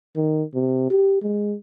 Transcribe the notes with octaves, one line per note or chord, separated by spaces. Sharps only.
D#3
C3
G4
G#3